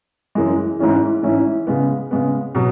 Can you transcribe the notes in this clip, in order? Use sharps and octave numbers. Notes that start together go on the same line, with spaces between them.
F#2 E3 G#3
G#2 E3 C#4 E4
G#2 E3 C#4 E4
C#3 G#3 B3
C#3 G#3 B3
B2 F#3